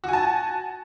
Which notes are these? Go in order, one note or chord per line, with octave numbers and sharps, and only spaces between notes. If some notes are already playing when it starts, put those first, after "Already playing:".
F#4 G#5 A5